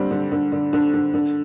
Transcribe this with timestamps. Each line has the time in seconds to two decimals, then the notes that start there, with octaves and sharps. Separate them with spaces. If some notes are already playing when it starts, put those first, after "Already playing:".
Already playing: D3 G3 C4
0.11 D3
0.32 D3
0.52 D3
0.73 D3
0.94 D3
1.14 D3